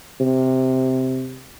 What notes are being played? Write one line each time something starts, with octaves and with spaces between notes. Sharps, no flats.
C3